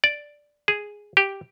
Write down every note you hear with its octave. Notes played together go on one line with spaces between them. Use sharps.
D5
G#4
G4